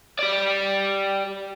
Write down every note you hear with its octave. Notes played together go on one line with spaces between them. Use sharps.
G4 D5